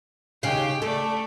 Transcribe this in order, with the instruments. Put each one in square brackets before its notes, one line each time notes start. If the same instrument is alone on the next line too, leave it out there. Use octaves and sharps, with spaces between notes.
[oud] D#2 C#3 F5 [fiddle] G4 G5
[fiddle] A3 D5 [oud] A4